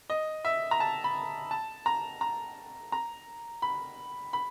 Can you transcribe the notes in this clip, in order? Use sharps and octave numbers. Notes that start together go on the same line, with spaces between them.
D#5
E5
A#5
A5
B5
A5
A#5
A#5
A#5
B5
B5